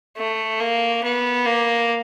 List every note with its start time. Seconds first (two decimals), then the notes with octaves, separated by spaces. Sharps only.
0.17 A3
0.60 A#3
1.04 B3
1.46 A#3